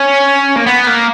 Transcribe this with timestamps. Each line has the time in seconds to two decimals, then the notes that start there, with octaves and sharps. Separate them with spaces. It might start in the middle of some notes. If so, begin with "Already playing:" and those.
Already playing: C#4
0.56 A#3
0.66 B3
0.87 A#3